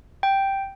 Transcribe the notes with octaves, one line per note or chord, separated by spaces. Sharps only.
G5